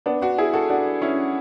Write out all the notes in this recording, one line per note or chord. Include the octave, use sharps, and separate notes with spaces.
B3 D4
D4 F#4
E4 G#4
F#4 A4
D4 F#4
C#4 E4